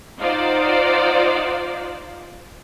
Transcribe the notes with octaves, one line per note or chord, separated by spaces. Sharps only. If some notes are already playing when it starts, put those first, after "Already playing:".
D#4 F4 C5 D5 F5 F#5